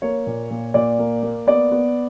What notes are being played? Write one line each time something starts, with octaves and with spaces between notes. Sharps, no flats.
A#3 C#5
A#2
A#2
A#2 D5
A#3
A#3
B3 D5
B3